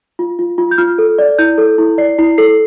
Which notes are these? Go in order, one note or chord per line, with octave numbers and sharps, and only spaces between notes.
F4
F4
F4
G6
F4 F6
A4
D5
E4 G6
A4
E4
D5 C7
E4 C7
A4 C7